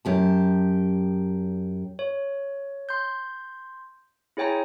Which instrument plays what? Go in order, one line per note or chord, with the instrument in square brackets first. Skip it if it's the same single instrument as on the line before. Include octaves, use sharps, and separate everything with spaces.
[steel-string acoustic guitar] F#2 G4 A5
[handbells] C#5
C6 G6
E4 G#4 C#5 G5 G#5 A#5